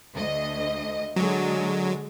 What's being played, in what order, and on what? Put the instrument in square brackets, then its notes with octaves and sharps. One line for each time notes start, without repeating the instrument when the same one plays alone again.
[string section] D2 D#5
[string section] D3 G#3 [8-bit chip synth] F#3